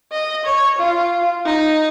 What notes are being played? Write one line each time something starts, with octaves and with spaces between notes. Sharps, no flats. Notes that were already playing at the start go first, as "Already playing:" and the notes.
D#5
C#5
F4
D#4